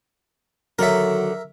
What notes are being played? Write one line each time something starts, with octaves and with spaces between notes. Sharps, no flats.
D3 D#3 F#3 A4 A#4 C#5 E5